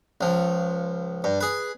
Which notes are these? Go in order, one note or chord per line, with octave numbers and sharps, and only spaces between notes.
C#2 F3
G2
G#4 B4